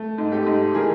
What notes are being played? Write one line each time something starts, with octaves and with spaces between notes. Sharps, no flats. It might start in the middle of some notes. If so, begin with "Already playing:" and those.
Already playing: A3
G#2
G4 A4
G#2
E3 G#4 A#4